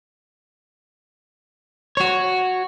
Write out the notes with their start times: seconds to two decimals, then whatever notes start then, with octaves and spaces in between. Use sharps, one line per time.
1.97 F#4 C#5